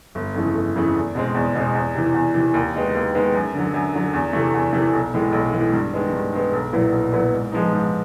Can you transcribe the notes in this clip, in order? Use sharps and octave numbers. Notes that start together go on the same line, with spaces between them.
G1
F2 C#3 E3 A3
G1
F2 C#3 E3 A3
E2
B2 G#3 C4
E2
B2 G#3 C4
E2
C3 E3
E2
C3 E3
D#2
D#3 G#3 B3
D#2
D#3 G#3 B3
F#2
D3 F#3
F#2
D3 F#3
E2
C3 E3 A3
E2
C3 E3 A3
B1
A2 E3 G#3
B1
A2 E3 G#3
G2
D#3 G#3 B3
G2
D#3 G#3 B3
B1
A#2 F#3 B3 E4
B1
A#2 F#3 B3 E4
G#2
F3 G#3 B3 D#4
G#2